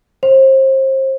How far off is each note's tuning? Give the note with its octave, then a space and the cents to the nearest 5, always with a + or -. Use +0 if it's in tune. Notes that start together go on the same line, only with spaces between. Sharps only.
C5 +30